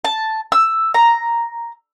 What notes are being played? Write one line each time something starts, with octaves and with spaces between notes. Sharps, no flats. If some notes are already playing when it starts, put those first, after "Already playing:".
A5
E6
A#5